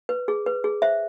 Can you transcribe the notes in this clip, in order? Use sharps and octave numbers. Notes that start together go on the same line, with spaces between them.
B4
G#4
B4
G#4
C5 E5